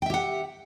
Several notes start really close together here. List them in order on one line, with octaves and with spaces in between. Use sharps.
G5 E5 G4 F#5